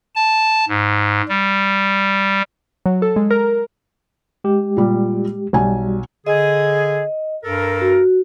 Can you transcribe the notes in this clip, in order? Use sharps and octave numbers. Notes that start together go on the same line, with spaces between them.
A5
G#2
G3
F#3
A4
G#3
A#4
G#3 G4
A#2 G3
B1 G3 F#4 G#5
D3 G#4 D#5
G2 A4 A#4
F#4